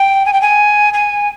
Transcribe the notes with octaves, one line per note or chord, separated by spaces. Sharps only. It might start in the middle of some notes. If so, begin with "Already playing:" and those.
Already playing: G5
G#5
G5
G#5
G#5